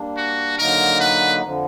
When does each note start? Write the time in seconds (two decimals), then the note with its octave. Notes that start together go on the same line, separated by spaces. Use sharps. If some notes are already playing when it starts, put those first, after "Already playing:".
Already playing: G3 A#3 D4
0.17 F#4
0.59 D3 F#3 A#3 D#4 A#4
1.00 B4
1.42 F2 D3 F3